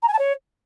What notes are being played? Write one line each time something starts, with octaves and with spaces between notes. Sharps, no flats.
A#5
G#5
A5
C#5